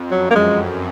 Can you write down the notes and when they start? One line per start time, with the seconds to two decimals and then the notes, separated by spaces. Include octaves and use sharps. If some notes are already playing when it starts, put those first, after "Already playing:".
Already playing: F2
0.11 F#2 F#3
0.31 A#3
0.35 G#3